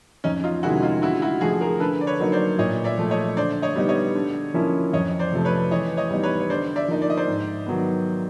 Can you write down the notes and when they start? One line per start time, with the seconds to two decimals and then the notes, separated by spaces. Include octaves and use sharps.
0.24 F2 C#4 D#4
0.44 D#4 F4
0.63 C3 D#3 G#3 C#4 E4 F#4
0.82 D#4 F4
1.02 D3 E4 F#4
1.22 E4 F#4
1.41 F3 A3 F#4 G#4
1.61 G#4 A#4
1.80 D3 A4 B4
2.01 D5
2.07 B4 C#5
2.20 F#3 A#3 D#4
2.32 C5 D5
2.59 A#2 C#5 D#5
2.84 D5 E5
2.98 F3 A3
3.11 C#5 D#5
3.37 D3 C5 D5
3.62 C#5 D#5
3.76 G3 B3 D#4
3.89 C#5 D#5
4.15 D3
4.54 F3 A#3 C#4 E4
4.93 F2 C#5 D#5
5.19 C5 D5
5.32 C3 F3 A3
5.45 B4 C#5
5.71 E3 C#5 D#5
5.97 C#5 D#5
6.11 G3 B3 D#4
6.23 B4 C#5
6.40 C#5
6.49 D3 C5 D5
6.76 D5 E5
6.88 F3 A#3 D#4
7.02 D5
7.10 D#5
7.17 C5 D5
7.28 G#2
7.66 D#3 F#3 B3